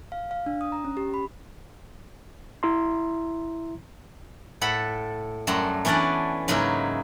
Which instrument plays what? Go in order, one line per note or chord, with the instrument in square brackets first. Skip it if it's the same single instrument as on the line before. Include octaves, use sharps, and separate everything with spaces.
[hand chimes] F5
F5
D4
D#6
A#5
C#4
G4
B5
[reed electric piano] E4 E5 A#5 C6
[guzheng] A2 A4 F#5 B5
F#2 G3 A3 F#5 A#5 C6
E3 B3 C#4 D4 D5 F#5
G#2 C#3 F#3 A#3 D#4 E4